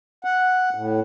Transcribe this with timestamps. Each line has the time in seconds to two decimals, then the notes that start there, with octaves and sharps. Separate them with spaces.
0.24 F#5
0.75 A2